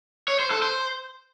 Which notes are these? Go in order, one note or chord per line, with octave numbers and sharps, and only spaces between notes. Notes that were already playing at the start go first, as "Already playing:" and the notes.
C#5
C5
A4
C5